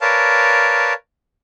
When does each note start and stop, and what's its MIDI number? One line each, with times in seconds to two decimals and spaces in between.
0.01 0.93 70
0.01 0.93 71
0.01 0.93 73
0.01 0.93 74
0.01 0.93 77
0.01 0.93 81